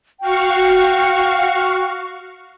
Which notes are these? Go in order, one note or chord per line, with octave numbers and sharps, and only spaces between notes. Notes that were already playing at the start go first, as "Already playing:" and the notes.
F#4 F5 G5 C#6